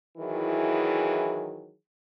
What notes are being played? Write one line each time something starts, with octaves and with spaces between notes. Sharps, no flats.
D#3 E3 F#3 E4 G#4